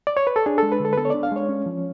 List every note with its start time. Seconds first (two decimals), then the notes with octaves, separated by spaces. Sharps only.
0.07 D5
0.17 C#5
0.27 B4
0.36 A4
0.46 D4 G#4
0.58 G#3 A4
0.72 B4
0.80 D3 A4
0.93 B4
0.97 B3 A4
1.05 C#5
1.10 D4 D5
1.23 F5
1.32 G#3 C#5
1.49 C#4
1.66 F3